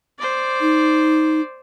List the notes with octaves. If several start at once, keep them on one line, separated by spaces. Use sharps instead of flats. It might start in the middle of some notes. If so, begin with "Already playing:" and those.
C5 D5
D#4